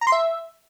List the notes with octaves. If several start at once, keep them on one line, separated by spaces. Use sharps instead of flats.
A#5
C6
E5